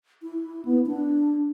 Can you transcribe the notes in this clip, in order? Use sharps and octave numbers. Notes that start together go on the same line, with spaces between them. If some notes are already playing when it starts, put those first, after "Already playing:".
E4
B3
D4